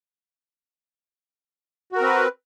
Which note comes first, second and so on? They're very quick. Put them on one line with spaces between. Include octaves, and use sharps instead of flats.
F#4 A#4 C4 B4